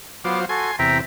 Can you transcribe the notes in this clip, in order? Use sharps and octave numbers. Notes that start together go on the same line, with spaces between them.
F#3 B3 F4 C5 D6
F#4 A4 G#5 C6
E2 C3 E5 G5 A#5